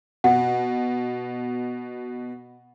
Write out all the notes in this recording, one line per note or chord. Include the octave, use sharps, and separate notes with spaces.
B2 F#5